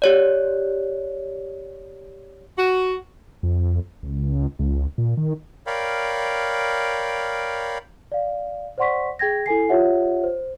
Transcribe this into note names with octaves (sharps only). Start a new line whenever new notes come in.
G4 C#5 D5
F#4
F2
C#2
C#2
A#2
D#3
A#4 C#5 D5 F5 G5 B5
D5 F5
C5 D5 F#5 C6 C#6 B6
G#4 G5 G#6 A#6
E4 A4 G#5 C7
F4 G4 C#5 E5 F#5
C5